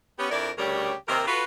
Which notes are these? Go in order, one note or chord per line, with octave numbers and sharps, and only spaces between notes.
B3 C#4 G4
F2 D4 E4 A#4 D5
D2 C#3 G3 G4 A#4 C#5
D#2 C3 D#3 C4 A#4
F4 F#4 A4 B4